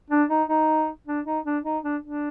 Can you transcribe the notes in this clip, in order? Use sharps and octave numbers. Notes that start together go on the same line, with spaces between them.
D4
D#4
D#4
D4
D#4
D4
D#4
D4
D4